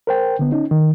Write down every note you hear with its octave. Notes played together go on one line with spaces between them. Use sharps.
A#4 C5 G5
D3 B3
C#4 D#4
D#3